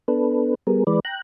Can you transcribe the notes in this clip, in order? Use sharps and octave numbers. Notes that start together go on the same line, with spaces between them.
B3 D4 A4 B4
G3 B3 G#4 A#4
E3 G#3 B4 D5
G5 A#5 F#6